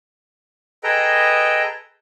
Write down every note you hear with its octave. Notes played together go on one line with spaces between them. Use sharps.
G#4 A4 B4 D#5 G5 A#5